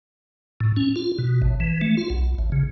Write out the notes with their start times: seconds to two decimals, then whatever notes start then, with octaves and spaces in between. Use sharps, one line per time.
0.60 A2
0.76 C#4
0.96 F4
1.19 B2
1.42 A1
1.60 E3
1.81 A3
1.97 F4
2.10 B1
2.39 A1
2.52 C#3